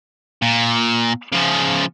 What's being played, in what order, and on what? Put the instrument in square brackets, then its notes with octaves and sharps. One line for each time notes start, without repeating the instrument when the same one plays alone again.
[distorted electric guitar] A#2
C#3 F3